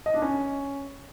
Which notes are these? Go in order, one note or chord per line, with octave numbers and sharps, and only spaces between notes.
D#5
D4
C#4